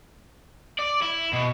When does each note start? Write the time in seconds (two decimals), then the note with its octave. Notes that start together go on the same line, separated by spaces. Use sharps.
0.79 D5
1.02 E4
1.33 B2